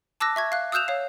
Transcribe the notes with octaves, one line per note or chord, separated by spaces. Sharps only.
A5 D6 E6 F#6 A#6
E5 C#6 G#6
F5 F#6
D#6 E6 F#6 G6 E7 F7
C#5 F5